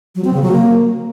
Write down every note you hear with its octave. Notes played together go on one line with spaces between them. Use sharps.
F#3
C4
C#3
F#3
A#3